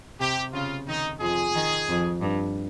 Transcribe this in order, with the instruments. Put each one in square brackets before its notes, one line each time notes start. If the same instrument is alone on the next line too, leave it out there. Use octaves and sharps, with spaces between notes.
[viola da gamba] C3 [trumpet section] G4
[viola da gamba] C#3 [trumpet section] F4
[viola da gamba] D#3 [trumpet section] D#4
[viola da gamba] F2 F3 [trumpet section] G#4
[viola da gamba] D#3
F2
G2